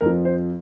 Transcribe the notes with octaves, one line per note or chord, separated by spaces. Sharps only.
F2 F3 A#4
C5